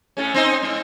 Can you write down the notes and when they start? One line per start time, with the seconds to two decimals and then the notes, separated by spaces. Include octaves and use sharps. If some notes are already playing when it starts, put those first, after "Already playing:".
0.17 A2 A3 C#4
0.34 C4 D#4
0.63 G#2